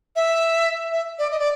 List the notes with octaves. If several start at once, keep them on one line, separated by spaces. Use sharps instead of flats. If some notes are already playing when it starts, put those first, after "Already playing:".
E5
E5
D5
D#5
D5